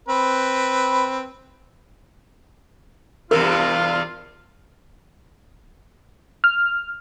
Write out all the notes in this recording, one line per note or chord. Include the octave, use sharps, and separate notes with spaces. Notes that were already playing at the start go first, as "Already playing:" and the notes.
C4 B4
E2 G2 C3 F4 A#4
F6